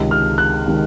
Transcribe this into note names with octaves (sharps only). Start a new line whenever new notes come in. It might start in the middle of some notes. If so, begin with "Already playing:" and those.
Already playing: C#2 C3 D#3 G#3
F6
F#6
C3 D#3 G#3